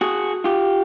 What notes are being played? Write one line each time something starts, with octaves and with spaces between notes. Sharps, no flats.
F#4 G#4
F4 G4